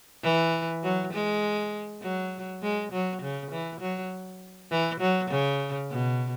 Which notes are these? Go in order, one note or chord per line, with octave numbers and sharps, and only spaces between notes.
E3
F#3
G#3
F#3
G#3
F#3
C#3
E3
F#3
E3
F#3
C#3
B2